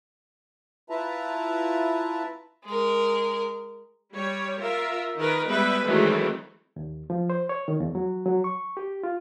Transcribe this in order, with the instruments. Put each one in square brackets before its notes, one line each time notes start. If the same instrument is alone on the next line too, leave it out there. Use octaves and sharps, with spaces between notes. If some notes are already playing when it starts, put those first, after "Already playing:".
[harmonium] E4 F4 B4 E5 A5 A#5
[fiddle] G#3 A#4
[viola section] G3 C#5
F4 A#4 E5
D#3 A#4 B4
G3 G#3 B3 B4 E5
D#3 E3 F#3 G#3 A3 C4
[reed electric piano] D#2
F3
C5
C#5
D#3
E2
F#3
F#3
C#6
G4
F4